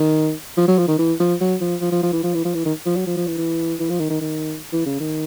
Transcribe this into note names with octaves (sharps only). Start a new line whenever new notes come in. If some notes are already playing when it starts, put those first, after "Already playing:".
Already playing: D#3
F3
F#3
F3
D#3
E3
F3
F#3
F3
F3
F3
F3
E3
F3
E3
F3
E3
D#3
F3
F#3
F3
F3
E3
E3
E3
F3
D#3
D#3
D#3
E3
C#3
D#3